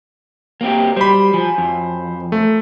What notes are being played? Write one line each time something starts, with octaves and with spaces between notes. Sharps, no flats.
F#3 A#3 C4 G4 A#4 D#5
G3 C5 B5
F3 G#5 A#5
F2
A3 A#3 F4